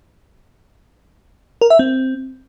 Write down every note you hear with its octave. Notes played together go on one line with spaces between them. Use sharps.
A#4
E5
C4